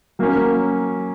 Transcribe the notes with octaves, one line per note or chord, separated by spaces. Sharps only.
F#3 A#3 C#4